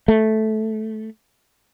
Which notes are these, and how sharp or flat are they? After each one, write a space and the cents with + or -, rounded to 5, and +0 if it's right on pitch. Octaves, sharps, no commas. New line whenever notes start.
A3 -10